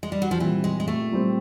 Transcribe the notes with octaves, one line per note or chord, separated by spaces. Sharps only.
G#3
G3
F#3
F3
A#2 E3 G3 C4
G#3
G#3
A3
A#2 G3 C4